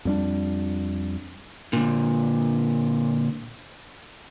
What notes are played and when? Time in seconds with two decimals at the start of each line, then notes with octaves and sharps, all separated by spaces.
0.05 F2 G3 D4
1.73 A#2 D3